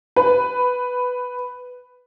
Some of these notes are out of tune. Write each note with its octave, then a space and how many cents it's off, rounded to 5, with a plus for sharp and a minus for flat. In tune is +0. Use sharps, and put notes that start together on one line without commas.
B4 +10